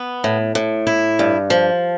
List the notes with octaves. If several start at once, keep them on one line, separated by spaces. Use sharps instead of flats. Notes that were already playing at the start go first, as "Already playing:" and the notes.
Already playing: B3
A2
A2
E4
G2
F3